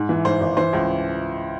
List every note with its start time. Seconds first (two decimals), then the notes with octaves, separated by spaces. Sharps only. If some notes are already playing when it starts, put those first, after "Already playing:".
Already playing: G#2
0.09 E3
0.25 G#2 C5
0.41 G#1
0.57 E3 C5
0.73 C#2